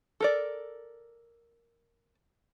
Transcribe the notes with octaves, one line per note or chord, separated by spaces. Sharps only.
A4 A#4 D5